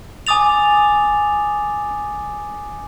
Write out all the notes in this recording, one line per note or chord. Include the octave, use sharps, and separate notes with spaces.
G#5 D6 D#6 A6 F7